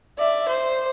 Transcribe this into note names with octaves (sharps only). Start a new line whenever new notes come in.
D5 E5
C5